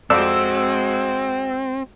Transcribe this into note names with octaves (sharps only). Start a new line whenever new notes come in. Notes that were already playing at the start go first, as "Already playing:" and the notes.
F2 G#3 C4 F#4 D5 E6